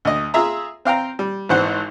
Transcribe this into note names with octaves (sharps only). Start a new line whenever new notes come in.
D2 D#5
F4 G#4 E5 A#5
C4 F5 G5 A#5
G3
G#1 G#2 E3 C5 F#5